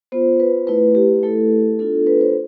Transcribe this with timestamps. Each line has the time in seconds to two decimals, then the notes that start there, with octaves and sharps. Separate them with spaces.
0.12 B3 F4 C5
0.40 B4
0.67 A3 E4 B4
0.95 G4
1.23 A3 E4 A4
1.79 B3 D4 F4 A4
2.07 B4
2.21 C5